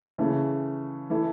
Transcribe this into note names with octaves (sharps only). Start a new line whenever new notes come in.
C#3 E3 A3
E3 A3 E4 A4